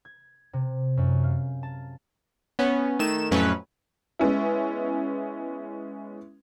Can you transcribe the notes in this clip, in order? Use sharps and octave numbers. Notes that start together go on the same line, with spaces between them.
G#6
C3
F#2
F5
A5
B3 C#4
D#3 A3 E7
F2 A2 F#3 C#4 B4
G#3 B3 C#4 E4